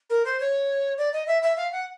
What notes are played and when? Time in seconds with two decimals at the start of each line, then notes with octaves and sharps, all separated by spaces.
0.10 A#4
0.25 C5
0.40 C#5
0.98 D5
1.13 D#5
1.27 E5
1.42 E5
1.57 F5
1.72 F#5